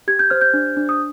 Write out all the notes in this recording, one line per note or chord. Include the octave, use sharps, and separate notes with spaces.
G4 G#6
G6
C5 F6
G6
D4
D4
D#6